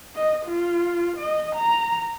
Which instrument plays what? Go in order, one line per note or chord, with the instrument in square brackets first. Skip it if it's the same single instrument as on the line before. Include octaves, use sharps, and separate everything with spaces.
[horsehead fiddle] D#5
F4
D#5
A#5